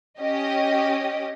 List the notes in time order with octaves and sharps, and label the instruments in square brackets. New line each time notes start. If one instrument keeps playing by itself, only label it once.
[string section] C#4 G4 D#5